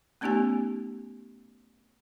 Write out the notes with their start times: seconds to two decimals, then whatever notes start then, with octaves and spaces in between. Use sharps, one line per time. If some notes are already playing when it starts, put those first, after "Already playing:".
0.21 A3 B3 C#4 D#4 G4 G#5